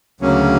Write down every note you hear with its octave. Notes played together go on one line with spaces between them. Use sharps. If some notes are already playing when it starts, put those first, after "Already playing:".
D2 C#3 F#3 A#3 C#4